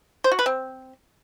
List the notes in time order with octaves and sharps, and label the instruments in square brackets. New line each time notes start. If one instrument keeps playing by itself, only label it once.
[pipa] C5
F#4
B4
C4